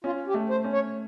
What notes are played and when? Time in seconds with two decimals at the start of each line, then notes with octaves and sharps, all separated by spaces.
0.04 C#4 F4
0.27 G4
0.34 A3
0.49 C5
0.64 C#4
0.73 C#5